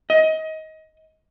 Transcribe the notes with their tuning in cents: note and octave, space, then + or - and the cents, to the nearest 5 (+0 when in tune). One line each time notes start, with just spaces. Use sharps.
D#5 +25